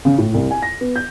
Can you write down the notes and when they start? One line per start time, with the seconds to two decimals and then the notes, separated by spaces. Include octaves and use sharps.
0.05 C#3
0.18 A2
0.34 C2
0.51 G#5
0.62 A#6
0.81 B3
0.96 G6